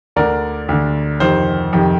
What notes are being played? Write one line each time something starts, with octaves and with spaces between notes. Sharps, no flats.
D2 D3 A#4 D5
D2 D3
F2 C3 D#3 C5
F2 C3 D#3